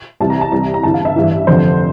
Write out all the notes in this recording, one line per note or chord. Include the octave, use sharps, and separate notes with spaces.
C2 C3 E3 A5
A#5
A5
C2 C3 E3 A#5
A#5
G1 G2 E3 A5
F5
E5
A1 G2 E3
F1 F2 D3 C5